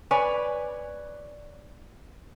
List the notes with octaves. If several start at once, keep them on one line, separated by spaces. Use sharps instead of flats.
B4 C#5 D5 G#5